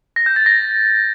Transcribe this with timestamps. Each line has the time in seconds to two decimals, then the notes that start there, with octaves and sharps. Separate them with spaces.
0.16 A#6
0.26 G6
0.36 A6
0.46 A#6